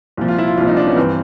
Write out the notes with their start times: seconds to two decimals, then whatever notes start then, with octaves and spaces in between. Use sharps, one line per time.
0.17 C2 A#2 F3
0.28 F4
0.38 E4
0.47 F4
0.58 C2 A#2 F3 F4
0.67 D#4
0.77 D4
0.87 C#4
0.92 B3
0.96 G2 E3 C4